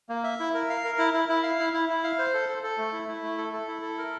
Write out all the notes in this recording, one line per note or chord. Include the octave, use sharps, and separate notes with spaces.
A#3
E5
E4
A#4
F5
A#4
E4
E4
E4
F5
E4
E4
E4
F5
C5
A4
A4
A4
A3
E4
E4
A3
A4
A4
E4
A4
A#4